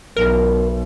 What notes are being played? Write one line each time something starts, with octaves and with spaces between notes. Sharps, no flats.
B1 A#4